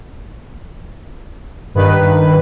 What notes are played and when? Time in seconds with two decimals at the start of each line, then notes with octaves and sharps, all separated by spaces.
1.75 G2 D#3 B4